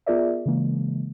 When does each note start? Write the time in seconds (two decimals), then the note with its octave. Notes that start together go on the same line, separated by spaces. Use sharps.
0.06 B3 F4 G#4 A#4 D5 E5
0.46 C#3 E3 G#3 A#3